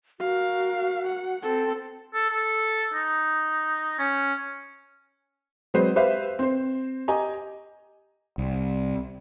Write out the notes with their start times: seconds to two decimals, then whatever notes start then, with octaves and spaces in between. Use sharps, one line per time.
0.20 F#4 A#4 F5
1.07 F#5
1.43 C4 A4
2.14 A4
2.30 A4
2.94 D#4
3.99 C#4
5.74 F#3 G#3 C4 B4 C5
5.96 G4 B4 C5 E5 F5
6.39 C4 C5
7.08 G4 D#5 G#5 A#5
8.38 C2